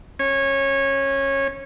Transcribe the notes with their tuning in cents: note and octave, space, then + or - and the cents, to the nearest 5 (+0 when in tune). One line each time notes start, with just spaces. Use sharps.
C#4 -20 C#5 -20